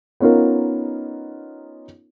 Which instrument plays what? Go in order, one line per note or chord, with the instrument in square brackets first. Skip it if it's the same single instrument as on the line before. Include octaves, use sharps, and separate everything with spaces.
[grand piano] B3 C#4 D#4 F4 A#4